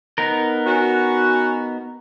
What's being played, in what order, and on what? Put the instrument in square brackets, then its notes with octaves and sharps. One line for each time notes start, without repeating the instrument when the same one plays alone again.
[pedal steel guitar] B3 D#4 A#4
[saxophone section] C#4 F#4